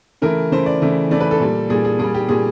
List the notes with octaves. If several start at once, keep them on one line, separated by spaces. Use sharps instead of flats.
C#3 E3 A3 A#4
C#3 E3 A3 C5
D5
C#3 E3 A3
C#3 E3 A3 D5
B4
A4
A#2 G3
A#2 G3 G#4
G#4
A#2 G3 G#4
G4
A#2 G3 G#4